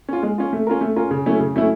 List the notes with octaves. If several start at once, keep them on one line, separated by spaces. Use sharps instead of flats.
C#4 F4
G#3
C#4 F4
A3
C#4 F4 A#4
A3
C#4 F4 A#4
C#3
F#3 A3 C#4 E4
C#3
F#3 A3 C#4 E4